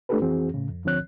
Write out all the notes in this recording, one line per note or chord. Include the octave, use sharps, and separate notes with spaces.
A3 D4 F4 G4 A4 B4
F2 E3 C4 F#4 G#4
A2 C#3
F2
D2 D3 F3 C4 C#5 F#6